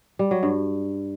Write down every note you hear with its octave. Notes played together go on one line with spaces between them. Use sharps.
G3
F#3
G2